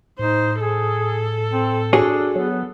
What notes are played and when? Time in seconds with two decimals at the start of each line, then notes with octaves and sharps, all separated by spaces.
0.19 A2 D#4 C5
0.60 G#4 A4
1.53 C4
1.93 D4 F#4 G#4 C#5
2.36 F#3 B3